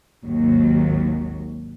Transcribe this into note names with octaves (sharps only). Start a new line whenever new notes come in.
G#1 D#2 F#3